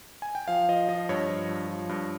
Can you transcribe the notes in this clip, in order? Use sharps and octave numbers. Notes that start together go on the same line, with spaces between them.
G#5
G5
F3 F5
F3 D#5
F3 D#5
G2 C#5
F3
G2
F3
G2